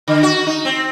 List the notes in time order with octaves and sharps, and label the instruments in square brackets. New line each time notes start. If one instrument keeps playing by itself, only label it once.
[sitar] D3
F#4
D#4
C4